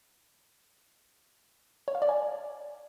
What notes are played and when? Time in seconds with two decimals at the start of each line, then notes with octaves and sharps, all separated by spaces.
1.88 C#5
1.95 F5
2.02 D5
2.09 G#5